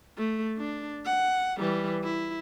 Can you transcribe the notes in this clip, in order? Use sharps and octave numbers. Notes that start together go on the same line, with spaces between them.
A3
D4
F#5
E3 G3
E4